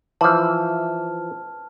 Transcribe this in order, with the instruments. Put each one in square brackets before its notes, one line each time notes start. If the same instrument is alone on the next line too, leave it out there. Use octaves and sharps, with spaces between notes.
[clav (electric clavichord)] E3 F3 [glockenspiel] A5 F6